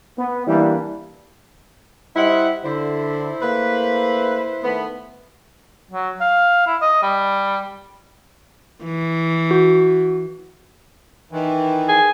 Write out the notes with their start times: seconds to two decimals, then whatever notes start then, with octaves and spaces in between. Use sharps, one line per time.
0.17 B3
0.46 E3 G3 A#3 D4 E4
2.16 G3 E4 C5 D#5 F#5
2.64 D3 E4 C5
3.41 A3 A#3 B4
4.62 D#3 A3 B3
5.91 F#3
6.21 F5
6.67 E4
6.82 D#5
7.03 G3
8.84 E3
9.51 F#4
11.31 D#3 E3
11.89 G#4